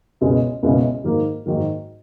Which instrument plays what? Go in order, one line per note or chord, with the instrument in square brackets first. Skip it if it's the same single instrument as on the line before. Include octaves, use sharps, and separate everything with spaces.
[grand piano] C#2 B2 G#3 C#4 E4
C#2 B2 G#3 C#4 E4
G#2 D#3 F#3 A#3
G#2 D#3 F#3 A#3